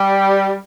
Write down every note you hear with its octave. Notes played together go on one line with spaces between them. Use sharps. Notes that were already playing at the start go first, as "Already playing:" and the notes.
Already playing: G3